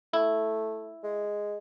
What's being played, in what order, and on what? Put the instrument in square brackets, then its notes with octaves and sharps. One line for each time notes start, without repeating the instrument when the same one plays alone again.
[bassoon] A3 [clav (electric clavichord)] E4
[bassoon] G#3